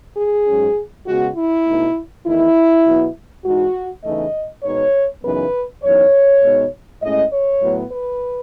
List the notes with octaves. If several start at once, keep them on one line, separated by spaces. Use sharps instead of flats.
G#4
G#2 F#3 C#4
C#3 G#3 B3 F#4
E4
B2 A3 D#4
E2 D#3 A3 D#4 E4
B2 F#3 B3
G#2 E3 G#3 D#4 F#4
E2 C#3 E3 A3 D#4 D#5
B2 G#3 B3 D#4 C#5
F#2 C#3 E3 B3 D#4 B4
F#2 E3 B3 D#4 C#5
B2 G#3 B3 D#4
A2 G#3 C#4 D#5
C#5
A2 F#3 B3
B4